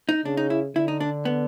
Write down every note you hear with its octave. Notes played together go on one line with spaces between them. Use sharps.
D#4
C#3 D4
D#4
E4
D3 E4
D#4
D4
B3